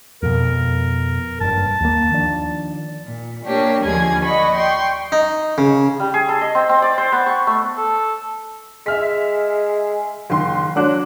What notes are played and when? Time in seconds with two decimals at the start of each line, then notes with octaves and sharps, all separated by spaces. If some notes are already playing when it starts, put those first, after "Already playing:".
0.23 F2 B2 A#4
1.41 F#1 G2 A5
1.81 D#2 A#3
2.12 D#3 F3 D4
3.04 A#2
3.45 A#3 D4 G4 C#5
3.84 D#2 D3 F3 A#3 G#4 G#6
4.23 D5 D#5 F#5 B5 C#6
4.56 G5 C6 C#6
5.12 D#4
5.58 C#3
6.00 G3
6.14 G#4
6.29 A4
6.41 D#5
6.55 C4
6.69 C4
6.82 D5
6.98 C5
7.12 B3
7.26 C#6
7.47 A3
7.77 A4
8.86 G#3 E5 F6 B6
10.30 F#1 D#3 C6
10.76 F#3 D4 F#6